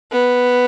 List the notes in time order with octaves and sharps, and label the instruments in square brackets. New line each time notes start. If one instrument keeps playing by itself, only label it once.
[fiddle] B3